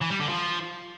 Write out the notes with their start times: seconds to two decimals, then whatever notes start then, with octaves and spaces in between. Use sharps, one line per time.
0.02 E3
0.11 G3
0.20 D3
0.29 F3